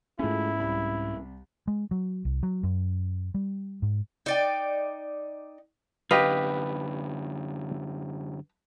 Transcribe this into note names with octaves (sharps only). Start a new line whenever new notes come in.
G#2 G#3 A3 C#4 E4 F4
C2 B5
G#3
F#3
C2
F#3
F#2
G3
G#2
D#4 D5 G5
F#2 D3 G4 B4 D#5 F5